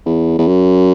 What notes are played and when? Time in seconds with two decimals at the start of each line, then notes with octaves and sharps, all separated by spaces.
0.05 E2
0.39 E2
0.47 F#2